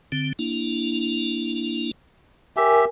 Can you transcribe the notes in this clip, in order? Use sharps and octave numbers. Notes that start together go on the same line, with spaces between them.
D3 C4
A#3 D4 E4
G4 A#4 E5 G#5